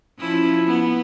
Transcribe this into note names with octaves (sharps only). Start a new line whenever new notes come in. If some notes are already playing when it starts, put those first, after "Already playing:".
F3 C#4 E4
B3